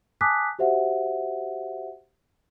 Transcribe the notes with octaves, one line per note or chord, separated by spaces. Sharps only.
G#5 A5 D6 D#6 F#6 B6
F#4 G4 C5 E5 F#5